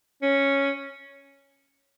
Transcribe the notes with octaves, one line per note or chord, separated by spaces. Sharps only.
C#4